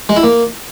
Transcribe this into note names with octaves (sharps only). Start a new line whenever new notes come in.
G#3
E4
A#3